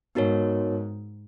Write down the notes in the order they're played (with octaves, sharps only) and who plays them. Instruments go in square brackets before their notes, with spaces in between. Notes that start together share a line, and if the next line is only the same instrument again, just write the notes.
[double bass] G#2 [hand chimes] B3 D#4 F#4 A#4 C#5